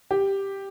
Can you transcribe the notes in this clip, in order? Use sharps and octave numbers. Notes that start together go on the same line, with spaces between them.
G4